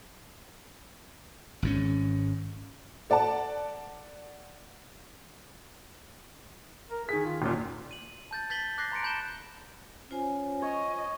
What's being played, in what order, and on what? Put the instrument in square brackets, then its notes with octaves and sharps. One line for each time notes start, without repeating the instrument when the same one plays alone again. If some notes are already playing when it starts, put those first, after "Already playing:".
[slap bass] G#1 G#2 C#4
[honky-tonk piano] A4 D5 F#5 A5
[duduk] A#4
[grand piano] D#3 B6 [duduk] G#4
[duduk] F4
[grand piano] E1 A#2 [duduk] C#4
[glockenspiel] D#7 F#7
A5 G6 A6
G6 A6 B6 F#7 G7
D6 F#6 G6 A6 A#6 C7
A#5 C6 A#6 C#7 D7
A5 B5 G6 A6 E7 G7
[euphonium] C#4 [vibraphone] F4 C5 G#5
[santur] C#5 [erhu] D#5